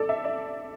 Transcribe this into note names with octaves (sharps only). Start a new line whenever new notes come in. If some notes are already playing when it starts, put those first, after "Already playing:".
Already playing: A4 D5
E5
D5